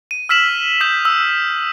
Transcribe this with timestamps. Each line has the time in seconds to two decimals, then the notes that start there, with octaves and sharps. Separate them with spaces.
0.11 D#7
0.29 E6 F6 B6 E7 F#7
0.80 D#6 G6 B6
1.05 E6